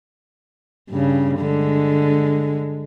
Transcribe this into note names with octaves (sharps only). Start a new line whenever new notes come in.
G2 C#3
D3 G#3